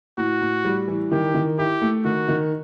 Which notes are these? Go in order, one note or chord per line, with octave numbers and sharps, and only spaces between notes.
A2 F#4
A2
G3
E3
D#3 G4
D#3
E4 G4
A3
D#3 F#4
D#3